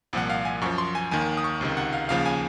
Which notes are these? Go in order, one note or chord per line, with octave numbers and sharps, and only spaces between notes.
C2 A#2 F3 F#5
F5
G#5
F#2 F3 C#6
C6
G#5
D#2 D#3 G#5
D#6
C#6
C#2 C3 D#3
F#5
F5
D#2 C#3 F3 F5
G#5